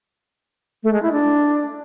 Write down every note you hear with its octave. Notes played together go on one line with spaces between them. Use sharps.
A3
G#3
E4
D4